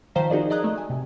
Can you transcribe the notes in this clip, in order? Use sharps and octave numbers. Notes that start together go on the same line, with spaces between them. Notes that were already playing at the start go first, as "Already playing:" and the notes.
D#3 F3 C5 F5 A#5 B6
D#4 F#4 G#4 A#4 D5 D#5
D5 D#5 A#5 D#6 F#6 G#6
A3
G#5
C3